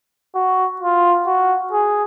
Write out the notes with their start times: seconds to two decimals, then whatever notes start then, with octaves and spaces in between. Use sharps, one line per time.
0.35 F#4
0.81 F4
1.27 F#4
1.72 G#4